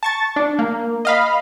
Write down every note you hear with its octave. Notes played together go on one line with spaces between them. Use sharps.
A5 C#6 A6
D4
A#3
D#5 F5 B5